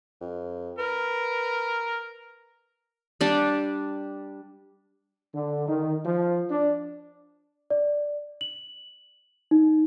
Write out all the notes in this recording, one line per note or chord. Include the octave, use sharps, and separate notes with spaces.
F2
A#4 B4
G3 D4 G4
D3
D#3
F3
D4
D5
F#7
D#4